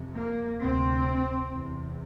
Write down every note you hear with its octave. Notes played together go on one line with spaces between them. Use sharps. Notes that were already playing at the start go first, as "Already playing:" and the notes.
Already playing: F2 C3
A#3
D2 C3 C4
E2 C3